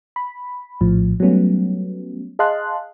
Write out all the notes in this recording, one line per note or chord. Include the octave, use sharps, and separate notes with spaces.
B5
A#1 A2 F3
F#3 G3 A3 B3 C#4
G#4 D#5 F5 A5 C6 F#6